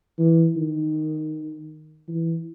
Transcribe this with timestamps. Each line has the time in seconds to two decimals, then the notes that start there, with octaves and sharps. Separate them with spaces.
0.19 E3
0.56 D#3
2.08 E3